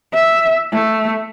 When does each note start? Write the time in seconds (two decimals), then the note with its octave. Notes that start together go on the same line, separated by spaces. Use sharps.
0.14 E5
0.73 A3